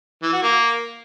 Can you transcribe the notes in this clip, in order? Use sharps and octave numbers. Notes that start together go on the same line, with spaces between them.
E3
F#4
A#3